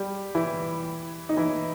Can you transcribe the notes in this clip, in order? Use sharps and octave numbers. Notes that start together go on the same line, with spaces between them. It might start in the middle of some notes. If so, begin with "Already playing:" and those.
Already playing: G3 G4
E3 E4
D#4
E3 E4